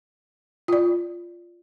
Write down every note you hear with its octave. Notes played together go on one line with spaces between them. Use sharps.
F4 D5